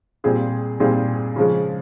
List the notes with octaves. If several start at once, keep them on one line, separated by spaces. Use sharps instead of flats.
A#2 G3 C4 F4 G#4
A#2 G3 C4 F4 G#4
C#3 F3 G#3